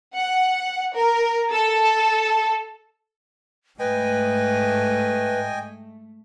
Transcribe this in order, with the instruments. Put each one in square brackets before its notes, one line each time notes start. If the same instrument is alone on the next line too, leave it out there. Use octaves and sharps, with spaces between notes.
[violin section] F#5
A#4
A4
[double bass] G#2 [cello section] A3 [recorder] B4 [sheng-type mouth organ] D#5 G5 G#5